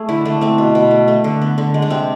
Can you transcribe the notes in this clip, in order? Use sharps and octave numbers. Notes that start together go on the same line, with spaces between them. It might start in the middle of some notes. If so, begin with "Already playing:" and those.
Already playing: A3 G#4
D3 E4
A3 D4
A3 C4
B2
B2
A3
A3
D3
B3
D3
G#3
D4
C3 C4